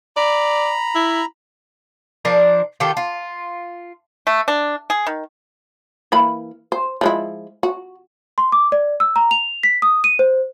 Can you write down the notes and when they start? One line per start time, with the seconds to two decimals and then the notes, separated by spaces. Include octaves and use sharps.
0.17 D5 A#5 B5
0.95 E4
2.25 F3 D4 A#4
2.80 D#3 F4 G4 A4
2.97 F4
4.27 A3
4.48 D4
4.90 G#4
5.07 D#3
6.12 E3 A#3 B5
6.72 C5
7.01 F3 G#3 E4
7.63 F#4
8.38 C6
8.52 D6
8.72 D5
9.00 E6
9.16 A#5
9.31 F7
9.63 B6
9.82 D#6
10.04 D#7
10.19 C5